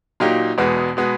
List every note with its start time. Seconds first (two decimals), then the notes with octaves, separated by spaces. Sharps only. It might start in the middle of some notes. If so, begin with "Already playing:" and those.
0.20 A#2 F#3 A#3 D#4 G4
0.58 E1 E2 B2 G#3 B3
0.97 B2 G#3 B3